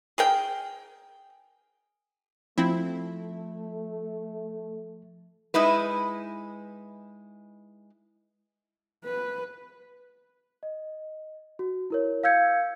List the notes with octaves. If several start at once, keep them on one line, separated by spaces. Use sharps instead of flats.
G#4 A#4 G5
F3 A3 C4 E4
G#3 D#4 E4 B4
B4
D#5
F#4
E4 A#4 C#5
F5 E6 G6 G#6 C#7